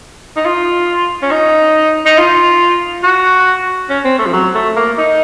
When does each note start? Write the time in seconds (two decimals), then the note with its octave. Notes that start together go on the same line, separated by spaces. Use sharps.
0.36 D#4
0.45 F4
1.22 C#4
1.31 D#4
2.06 D#4
2.18 F4
3.03 F#4
3.90 C#4
4.05 C4
4.19 A3
4.26 F3
4.33 F#3
4.55 A3
4.76 A#3
4.98 D#4